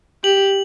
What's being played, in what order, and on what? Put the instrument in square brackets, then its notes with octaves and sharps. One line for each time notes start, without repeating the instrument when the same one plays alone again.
[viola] G4 [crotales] F#7